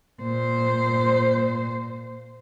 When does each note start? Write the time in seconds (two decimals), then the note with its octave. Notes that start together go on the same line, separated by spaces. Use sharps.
0.22 A#2 C5